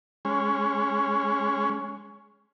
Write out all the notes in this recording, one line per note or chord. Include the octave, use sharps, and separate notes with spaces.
G#3 C#4